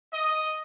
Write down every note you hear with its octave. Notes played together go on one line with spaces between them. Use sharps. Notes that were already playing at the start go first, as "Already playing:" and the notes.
D#5